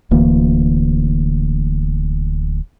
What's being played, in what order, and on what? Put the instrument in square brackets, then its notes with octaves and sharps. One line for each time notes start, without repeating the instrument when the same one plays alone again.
[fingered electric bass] D1 D2 E3 A#3